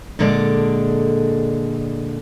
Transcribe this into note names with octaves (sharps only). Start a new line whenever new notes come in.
A#2 D3 G#3 A4 D5